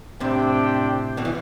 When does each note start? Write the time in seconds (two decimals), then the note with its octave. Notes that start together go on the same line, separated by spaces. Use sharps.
0.20 A2 C3 D4 G4 C5 E5 G5
1.17 B2 D3
1.25 E3